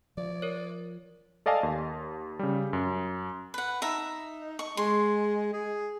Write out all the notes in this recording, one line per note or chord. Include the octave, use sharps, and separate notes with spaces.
F3 D5
A#4 C#5
A4 D5 D#5 F5 G#5 A5
D#2
C#3 G3
F#2
B4 F#5
D#4 E5 A#5
C#6
G#3 C6
G#4